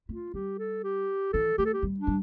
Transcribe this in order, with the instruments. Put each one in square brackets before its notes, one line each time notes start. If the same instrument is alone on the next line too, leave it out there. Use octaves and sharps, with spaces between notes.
[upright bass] A3 [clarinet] F4
[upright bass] G3 [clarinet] G4
[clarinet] A4
G4
[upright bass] E3 [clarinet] A4
[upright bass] A3 [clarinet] G4
[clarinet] A4
G4
[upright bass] G3
[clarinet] D4
[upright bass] G3